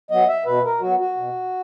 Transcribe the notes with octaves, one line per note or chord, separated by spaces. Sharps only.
F#3 B3 D#5
E5
B2 B4
A#4
F#3 B3 F#4
F#4
B2